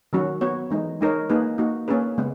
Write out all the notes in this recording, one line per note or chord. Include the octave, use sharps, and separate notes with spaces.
D#3 F#3 C#4 F#4
B3 F#4 C#5
E3 G#3 D#4
G#3 D#4 A#4 C#5
A#3 D#4 G#4 B4
A#3 D#4 F#4
A#3 C#4 G#4 B4
C#3 G#3 B3